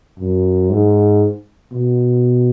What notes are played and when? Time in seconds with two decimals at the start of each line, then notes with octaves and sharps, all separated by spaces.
0.19 F#2
0.71 G#2
1.72 B2